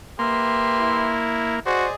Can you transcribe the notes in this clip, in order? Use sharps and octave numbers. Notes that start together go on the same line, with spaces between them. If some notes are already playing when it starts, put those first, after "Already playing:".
A#3 G4 B4 E5 C6
E4
F#4 G#4 C5 D5 D#5